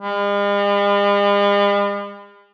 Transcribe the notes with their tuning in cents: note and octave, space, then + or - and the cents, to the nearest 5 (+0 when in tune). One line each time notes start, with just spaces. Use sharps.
G#3 -45